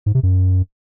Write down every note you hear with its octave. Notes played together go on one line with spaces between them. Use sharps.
G#2
C3
F#2